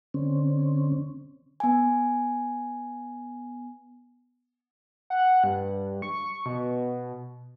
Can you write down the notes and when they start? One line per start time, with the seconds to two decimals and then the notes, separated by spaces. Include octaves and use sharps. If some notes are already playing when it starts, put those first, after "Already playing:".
0.14 D3 C4 C#4
1.60 B3 G#5
5.10 F#5
5.44 G2
6.02 C#6
6.46 B2